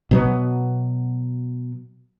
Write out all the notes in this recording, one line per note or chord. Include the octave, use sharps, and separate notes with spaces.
B2 F#3 B3